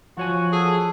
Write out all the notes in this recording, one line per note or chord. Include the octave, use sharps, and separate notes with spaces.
F3 F#4 C#5 G#5
G#4 A4